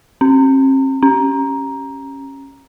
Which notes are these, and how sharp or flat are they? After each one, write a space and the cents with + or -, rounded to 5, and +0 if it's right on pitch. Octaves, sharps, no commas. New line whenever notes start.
C4 +45
C#4 -15